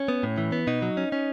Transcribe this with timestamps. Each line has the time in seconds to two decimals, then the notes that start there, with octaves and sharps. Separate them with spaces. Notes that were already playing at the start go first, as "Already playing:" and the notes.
Already playing: C#4
0.08 B3
0.23 A2
0.38 E3
0.52 B3
0.67 B2 D#4
0.82 F#3
0.97 C#4
1.12 C#4